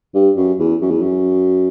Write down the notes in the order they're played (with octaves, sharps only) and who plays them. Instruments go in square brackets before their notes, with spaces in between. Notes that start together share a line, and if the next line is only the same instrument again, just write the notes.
[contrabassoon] G2
F#2
E2
F#2
E2
F#2